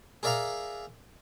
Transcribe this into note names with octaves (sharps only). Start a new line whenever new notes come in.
G#4 A#4 D5 E5 F5 A#5